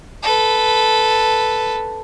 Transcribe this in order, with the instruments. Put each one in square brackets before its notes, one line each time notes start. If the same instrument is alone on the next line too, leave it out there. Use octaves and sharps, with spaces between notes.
[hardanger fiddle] A4 B4